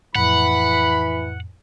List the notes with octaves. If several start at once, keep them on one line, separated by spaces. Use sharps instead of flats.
F2 A2 E3 F#5 B5